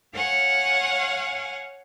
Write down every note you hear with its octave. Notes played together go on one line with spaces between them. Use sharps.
C#5 F5 F#5 G#5